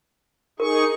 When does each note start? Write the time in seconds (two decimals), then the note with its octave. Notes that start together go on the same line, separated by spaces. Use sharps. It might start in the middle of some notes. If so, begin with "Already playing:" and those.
0.60 D#4 G#4 A#4 C#6